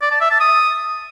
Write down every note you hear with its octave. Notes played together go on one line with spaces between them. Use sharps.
D5
A5
E5
A5
D#6